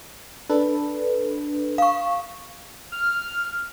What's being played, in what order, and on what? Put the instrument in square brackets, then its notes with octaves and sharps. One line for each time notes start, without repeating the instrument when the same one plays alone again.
[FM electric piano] D4 A4 B4
[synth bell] F5 C#6
[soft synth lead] F6